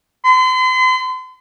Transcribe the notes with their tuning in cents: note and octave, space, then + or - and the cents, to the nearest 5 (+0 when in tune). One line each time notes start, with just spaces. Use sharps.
C6 -40